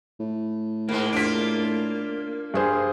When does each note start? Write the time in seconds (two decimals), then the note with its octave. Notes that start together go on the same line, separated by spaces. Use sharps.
0.20 A2
0.89 G#2 G#3 A#3
1.12 D4 F4 B6 D7
2.54 G2 G#4 C5